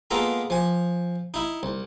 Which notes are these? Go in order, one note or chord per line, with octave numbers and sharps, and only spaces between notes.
G#3 A#3 B3 F4 A4 A#5
F3 G#5
D#4 E4
C2